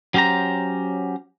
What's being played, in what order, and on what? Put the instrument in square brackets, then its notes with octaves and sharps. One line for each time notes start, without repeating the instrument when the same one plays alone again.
[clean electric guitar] F#3 C#4 G4 C5 A#5